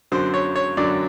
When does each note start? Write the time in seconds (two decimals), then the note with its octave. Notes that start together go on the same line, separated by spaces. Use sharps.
0.12 F#2 D3 F#3 C5
0.34 C#5
0.56 C#5
0.77 F#2 D3 F#3 D5